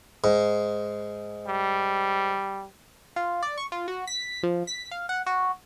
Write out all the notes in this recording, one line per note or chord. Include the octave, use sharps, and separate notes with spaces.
G#2
G3
F4
D5
C#6
F4
F#4
B6
F3
B6
F5
F#5
F#4